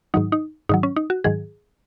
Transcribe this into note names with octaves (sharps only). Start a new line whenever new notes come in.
G#2 D#3 F#3 D#4
D#4
G#2 D#3 F#3 D#4
C#4
D#4
F#4
G#2 D#3 F#3 G#4